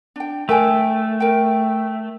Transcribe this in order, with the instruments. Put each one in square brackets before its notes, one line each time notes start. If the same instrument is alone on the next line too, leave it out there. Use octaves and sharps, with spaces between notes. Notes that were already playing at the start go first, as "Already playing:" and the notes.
[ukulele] D4 G5
[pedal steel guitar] A3 [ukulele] A#4 G5 G#5
[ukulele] A#4 G5